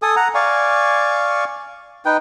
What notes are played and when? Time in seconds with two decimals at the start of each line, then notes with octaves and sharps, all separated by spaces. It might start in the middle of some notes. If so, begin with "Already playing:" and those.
0.02 A4 G#5 D#6
0.16 F#5 A#5
0.35 D5 F5 G#5 C#6
2.05 D#4 B4 G5